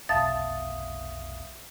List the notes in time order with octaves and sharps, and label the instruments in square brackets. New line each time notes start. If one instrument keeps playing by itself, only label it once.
[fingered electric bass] F1 B1 [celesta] E5 F5 D#6 [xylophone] A5 A6